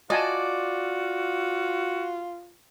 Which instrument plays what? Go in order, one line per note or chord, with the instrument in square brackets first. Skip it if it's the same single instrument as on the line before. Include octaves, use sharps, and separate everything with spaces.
[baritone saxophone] F4 [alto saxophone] F#4 [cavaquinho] D5 [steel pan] D#5 G#5 A5